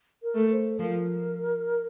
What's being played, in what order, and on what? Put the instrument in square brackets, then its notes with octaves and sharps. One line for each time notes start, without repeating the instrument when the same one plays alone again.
[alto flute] A#4
[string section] A3
[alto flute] C5
[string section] F3 [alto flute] A#4